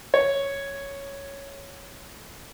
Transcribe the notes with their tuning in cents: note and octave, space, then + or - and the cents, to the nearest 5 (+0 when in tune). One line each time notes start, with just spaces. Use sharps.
C#5 +0